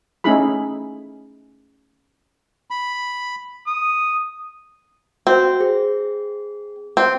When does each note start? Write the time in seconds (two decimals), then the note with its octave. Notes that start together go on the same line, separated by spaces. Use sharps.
0.24 A3 C#4 D#4 E4 G#4 B5
2.71 B5
3.67 D#6
5.27 C4 F#4 C5
5.60 G#4
6.97 C4